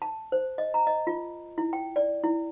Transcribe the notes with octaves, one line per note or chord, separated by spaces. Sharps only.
A5
C5
D#5
A#5
D#5
F4
E4
G5
D5
E4